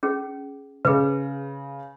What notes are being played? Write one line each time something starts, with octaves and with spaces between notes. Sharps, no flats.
C#4 G#4
C#3 G#4 B4